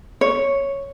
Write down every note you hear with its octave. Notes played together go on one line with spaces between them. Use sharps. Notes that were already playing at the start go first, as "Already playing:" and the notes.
C#5